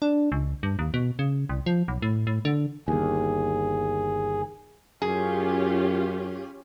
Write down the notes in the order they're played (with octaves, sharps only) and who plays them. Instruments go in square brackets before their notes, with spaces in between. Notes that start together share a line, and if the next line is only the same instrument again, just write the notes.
[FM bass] D4
C#2
G2
D#2
B2
C#3
C2
F3
B1
A2
A2
D3
[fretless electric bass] G1 D#2 [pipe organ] G#4
[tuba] F#2 [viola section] C#4 F4 G4 [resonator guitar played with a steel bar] G#4